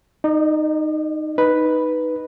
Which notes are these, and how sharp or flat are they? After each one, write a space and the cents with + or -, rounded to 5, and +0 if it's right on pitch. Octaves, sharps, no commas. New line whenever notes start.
D#4 -5 D5 +45
D#4 +0 B4 +0